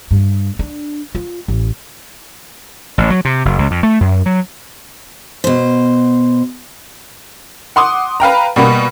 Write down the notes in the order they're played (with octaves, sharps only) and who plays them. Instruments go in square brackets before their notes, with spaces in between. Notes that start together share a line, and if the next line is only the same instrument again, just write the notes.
[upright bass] G2
D4
F4
A1
[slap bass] A1
F#3
C3
F#1
C#2
F2
A3
F#2
F#3
[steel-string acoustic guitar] B2 C5
[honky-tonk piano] F#5 C6 D6 D#6
B4 F5 G5 A#5
B2 G3 A#3 B3